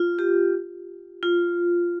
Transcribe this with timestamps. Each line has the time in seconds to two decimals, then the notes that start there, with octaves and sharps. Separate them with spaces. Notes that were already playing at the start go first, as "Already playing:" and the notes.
Already playing: F4
0.19 G4
1.23 F4